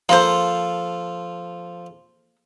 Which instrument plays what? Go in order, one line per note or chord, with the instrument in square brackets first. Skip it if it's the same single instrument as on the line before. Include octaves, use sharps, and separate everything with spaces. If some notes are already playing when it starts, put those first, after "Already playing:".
[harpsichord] F3 F4 A4 [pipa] A#3 C5